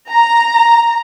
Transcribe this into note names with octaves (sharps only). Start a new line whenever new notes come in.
A#5